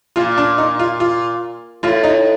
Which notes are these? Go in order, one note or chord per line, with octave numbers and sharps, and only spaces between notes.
A#2 F4
D4
D#4
F4
F4
A2 F4
D#4